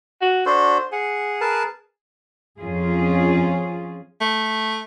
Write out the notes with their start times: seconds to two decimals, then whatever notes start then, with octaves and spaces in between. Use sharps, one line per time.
0.21 F#4
0.46 D4 F#4 A4 C5
0.92 G#4 F#5
1.41 A#4 B4 A5
2.58 F2 C#4 F4 G#4
4.21 A3